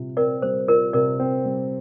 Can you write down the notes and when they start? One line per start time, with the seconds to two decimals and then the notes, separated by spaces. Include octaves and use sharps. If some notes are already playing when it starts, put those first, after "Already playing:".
Already playing: C3 G3 C4 F4
0.17 C4 A#4 D5
0.42 G3 C5
0.68 F4 A#4 D5
0.93 C3 A#4 D5
1.20 C4
1.45 G3